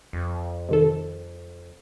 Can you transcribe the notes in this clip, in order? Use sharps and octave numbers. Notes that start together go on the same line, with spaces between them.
F2
C3 D#3 A4